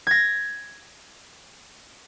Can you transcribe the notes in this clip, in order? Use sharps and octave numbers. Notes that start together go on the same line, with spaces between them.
G#6 A#6